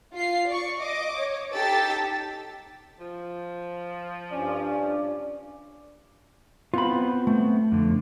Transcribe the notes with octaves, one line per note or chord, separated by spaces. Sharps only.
F4 C7
D5 C#6
D#5 D6
C#5
D#4 G4 A4 E6 A6 B6
F3
G2 C#4 D5
B3 C4 F4 B5
A3
F2 D3